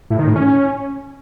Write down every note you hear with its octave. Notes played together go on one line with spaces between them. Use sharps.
A2
D#3
A2
C#4